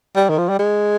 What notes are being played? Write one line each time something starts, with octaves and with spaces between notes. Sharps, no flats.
G3
D#3
F3
G3
G#3